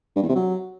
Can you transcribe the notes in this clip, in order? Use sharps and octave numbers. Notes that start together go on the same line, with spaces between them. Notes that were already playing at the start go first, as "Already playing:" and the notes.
G2
E2
C3
F#3